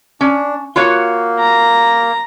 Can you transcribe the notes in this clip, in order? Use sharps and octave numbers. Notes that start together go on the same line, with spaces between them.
C#4 D4
A#3 F4 F#4 C#5
A#5